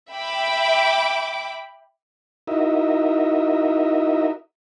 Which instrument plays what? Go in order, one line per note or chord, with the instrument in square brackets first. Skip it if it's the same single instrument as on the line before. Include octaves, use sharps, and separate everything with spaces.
[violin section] E5 G5 B5 D6
[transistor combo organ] D#4 E4 F#4 A#4 D#5 E5